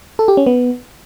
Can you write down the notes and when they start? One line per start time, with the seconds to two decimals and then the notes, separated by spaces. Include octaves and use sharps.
0.19 A4
0.28 G4
0.37 C#4
0.46 B3